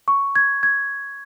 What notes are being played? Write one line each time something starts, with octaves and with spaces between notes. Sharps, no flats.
C#6
G#6
G#6